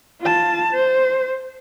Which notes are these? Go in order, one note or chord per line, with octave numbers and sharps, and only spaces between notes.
F4 A5
C5